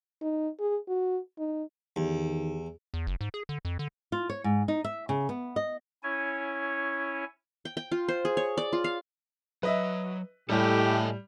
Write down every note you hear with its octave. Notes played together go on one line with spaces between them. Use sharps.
D#4
G#4
F#4
D#4
E2 D#3 G4
E2
F#1
G#2
G#4
D3
F2
D3
F4
C#5
G#2
D#4
E5
C#3
B3
D#5
C#4 E4 C#5 G#5
G5
G5
F4
C5
G#4
C#5
D5
F4
F5
F#3 B4 D#5 E5
A2 G3 G4 A4 D#5 G#5